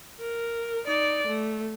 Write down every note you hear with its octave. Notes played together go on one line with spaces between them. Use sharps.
A#4
D#4 D5
A3